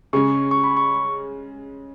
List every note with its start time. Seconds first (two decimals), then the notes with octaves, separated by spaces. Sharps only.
0.13 C#3 G#3 C#4 C#6
0.51 C#6
0.64 B5
0.77 C#6